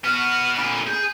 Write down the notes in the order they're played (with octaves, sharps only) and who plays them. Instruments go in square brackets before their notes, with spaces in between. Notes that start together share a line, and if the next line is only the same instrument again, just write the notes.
[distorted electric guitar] B3 F#4 [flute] F6
[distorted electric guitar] A#2 D3 [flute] B5
[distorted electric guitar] G#4 [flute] G6